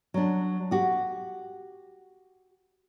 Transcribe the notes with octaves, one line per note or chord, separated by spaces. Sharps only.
F#3 D4
F#4 G4